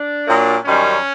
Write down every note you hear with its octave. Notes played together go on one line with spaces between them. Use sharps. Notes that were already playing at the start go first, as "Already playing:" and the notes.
Already playing: D4
A#2 F#3 A#3
F#2 D#3 G3 C#4